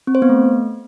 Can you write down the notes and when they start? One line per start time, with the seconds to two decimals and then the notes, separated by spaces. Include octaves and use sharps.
0.07 C4
0.15 C5
0.22 B3
0.29 A3